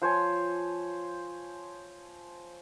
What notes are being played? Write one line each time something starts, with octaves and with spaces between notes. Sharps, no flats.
F3 C5 C#5 G#5